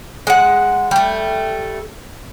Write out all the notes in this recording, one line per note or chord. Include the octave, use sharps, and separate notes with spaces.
G#3 F#5
G3 A3